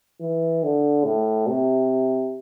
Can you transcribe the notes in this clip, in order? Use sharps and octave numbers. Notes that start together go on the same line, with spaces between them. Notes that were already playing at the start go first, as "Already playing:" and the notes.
E3
D3
A2
C3